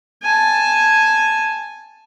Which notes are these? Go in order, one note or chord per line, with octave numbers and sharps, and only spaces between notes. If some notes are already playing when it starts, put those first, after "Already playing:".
G#5 A5